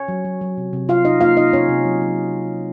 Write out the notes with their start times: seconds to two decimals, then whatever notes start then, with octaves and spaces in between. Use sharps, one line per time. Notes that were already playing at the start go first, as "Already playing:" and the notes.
Already playing: C#4 C#5
0.08 F#3
0.25 F#3
0.41 F#3
0.57 C3
0.73 C3
0.88 C3 F4 F5
1.05 C3 D#4 D#5
1.20 A#3 F4 F5
1.37 C3 D#4 D#5
1.53 C3 C#4 C#5
1.69 C3
1.85 F#3
2.01 F#3